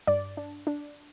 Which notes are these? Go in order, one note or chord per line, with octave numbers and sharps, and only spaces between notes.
G2 D5
D4
D4